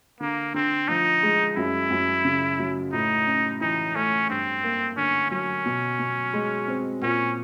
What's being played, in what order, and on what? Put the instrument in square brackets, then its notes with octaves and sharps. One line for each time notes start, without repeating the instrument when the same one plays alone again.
[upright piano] D3 [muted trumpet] A#3
[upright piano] D3 [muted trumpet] C4
[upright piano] F3 [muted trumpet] D#4
[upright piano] G#3
[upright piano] F#2 [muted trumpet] E4
[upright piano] F#2
C#3
F#3
[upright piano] A2 [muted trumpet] D#4
[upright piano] C#4
[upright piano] E3 [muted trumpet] D#4
[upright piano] A3 [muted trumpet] C#4
[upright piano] G2 [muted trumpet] C4
[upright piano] A#3
[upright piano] D3 [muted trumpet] C#4
[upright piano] F#3 [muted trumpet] C#4
[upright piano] B2
B2
G#3
C4
[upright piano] A#2 [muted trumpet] C#4